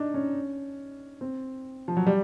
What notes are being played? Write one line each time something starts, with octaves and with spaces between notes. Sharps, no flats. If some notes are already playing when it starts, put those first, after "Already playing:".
Already playing: D4 D#4
C#4
C4
F3
F#3
G3